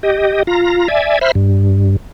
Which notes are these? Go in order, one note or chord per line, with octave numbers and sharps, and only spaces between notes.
G4 D#5
F4 A#5
D5 E5 G#5
C5 E5 B5 F6
G2